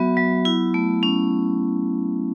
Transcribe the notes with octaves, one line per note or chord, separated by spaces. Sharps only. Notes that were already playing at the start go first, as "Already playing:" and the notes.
Already playing: F#3 B3 F#4 E5
F#3
E4
A3
C#4